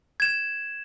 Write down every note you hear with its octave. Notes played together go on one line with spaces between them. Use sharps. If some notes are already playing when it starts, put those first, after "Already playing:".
G#6 E7